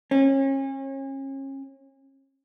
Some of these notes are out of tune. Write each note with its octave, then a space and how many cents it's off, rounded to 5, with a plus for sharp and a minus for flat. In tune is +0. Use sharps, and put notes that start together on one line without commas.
C#4 -35